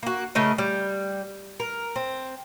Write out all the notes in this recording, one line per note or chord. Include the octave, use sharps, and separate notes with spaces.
A#3 F#4
C#3 A3 A#4 D#5
G3
A#4
C4